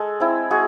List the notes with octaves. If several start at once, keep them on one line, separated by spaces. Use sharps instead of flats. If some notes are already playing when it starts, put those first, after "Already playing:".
Already playing: G#3 A4
C4 E4
G#3 F#4 G#4